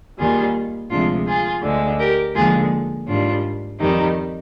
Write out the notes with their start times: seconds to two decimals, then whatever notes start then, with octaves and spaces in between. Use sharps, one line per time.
0.18 D#2 D#3 G3 F4 G#4
0.91 D2 C3 F3 G#3 D4 F4
1.27 F4 G#4
1.63 D2 D3 G#3
1.99 G4 A#4
2.35 D#2 D3 F3 G#3 F4 G#4
3.08 G#2 D#3 G3 D4 F4
3.80 F2 D#3 G3 D#4 G4